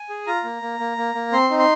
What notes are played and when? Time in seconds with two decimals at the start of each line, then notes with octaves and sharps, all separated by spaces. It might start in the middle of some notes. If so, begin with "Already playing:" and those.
Already playing: G#5
0.10 G#4
0.27 F4 A#5
0.44 A#3
0.62 A#3
0.79 A#3
0.97 A#3
1.15 A#3
1.32 C4 C6
1.51 D#4
1.59 C6